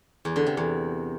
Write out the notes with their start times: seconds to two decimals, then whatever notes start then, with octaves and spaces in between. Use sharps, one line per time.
0.25 E2
0.36 D3
0.46 C3
0.57 E2